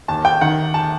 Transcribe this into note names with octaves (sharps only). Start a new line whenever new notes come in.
D#2 A5
G5
D#3 F#5
A5